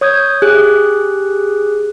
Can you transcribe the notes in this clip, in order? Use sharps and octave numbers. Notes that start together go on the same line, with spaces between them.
C#5 D#6 G6 G#6
G4 G#4 F#6